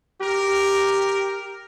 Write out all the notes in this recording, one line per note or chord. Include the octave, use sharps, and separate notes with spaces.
G4 A#4